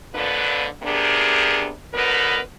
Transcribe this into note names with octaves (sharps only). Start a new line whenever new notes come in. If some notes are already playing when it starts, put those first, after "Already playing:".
F2 A#2 D3 B3 D4 B4
C3 B3 D4 G4 G#4 A#4
D3 F#3 B3 D#4 A#4 B4